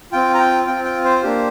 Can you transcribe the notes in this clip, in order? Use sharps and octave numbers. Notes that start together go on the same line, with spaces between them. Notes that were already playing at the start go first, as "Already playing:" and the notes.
C4 F4 G5
A#5
G5
C4 F4 G5
G5
C5
A#3 D4 G4